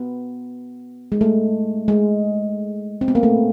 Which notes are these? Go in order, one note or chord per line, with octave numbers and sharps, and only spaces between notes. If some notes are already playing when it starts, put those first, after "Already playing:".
Already playing: B3
G#3
A3
G#3
C4
B3
A#3
A3